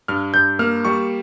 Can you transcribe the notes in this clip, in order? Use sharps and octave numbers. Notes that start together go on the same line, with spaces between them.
G2 F6
G2 G6
A#3 F6
G3 C#6